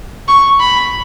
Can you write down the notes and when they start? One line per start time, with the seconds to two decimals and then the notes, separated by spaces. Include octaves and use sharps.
0.28 C#6
0.60 B5